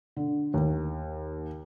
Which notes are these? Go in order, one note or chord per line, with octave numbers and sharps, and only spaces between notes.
D3
D#2